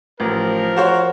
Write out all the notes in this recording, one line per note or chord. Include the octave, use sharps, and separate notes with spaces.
A1 F3 A#4
F#4 C5 C#5